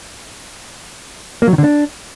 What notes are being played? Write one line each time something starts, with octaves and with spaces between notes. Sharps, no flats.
A#3
F#3
D#3
D3
D4